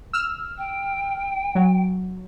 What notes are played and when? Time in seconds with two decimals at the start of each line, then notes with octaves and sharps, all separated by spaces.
0.13 E6 F6
0.58 G5
1.55 F#3